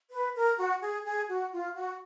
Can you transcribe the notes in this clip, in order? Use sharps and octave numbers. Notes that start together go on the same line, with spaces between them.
B4
A#4
F#4
G#4
G#4
F#4
F4
F#4